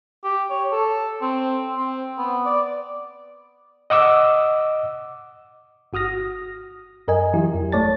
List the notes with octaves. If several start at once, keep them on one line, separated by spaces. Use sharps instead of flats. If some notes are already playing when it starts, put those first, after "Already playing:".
G4
C#5
A4
C4
C4
B3
D5
D#5 F#5 D6 E6
G1 F#4 D#6 F6 A#6
F#2 A#4 D#5 G#5
E3 F#3 E4 G4
F2
G1 A3 C#5 D5 A5 A6